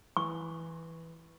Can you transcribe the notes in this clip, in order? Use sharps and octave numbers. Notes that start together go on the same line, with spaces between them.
E3 C#6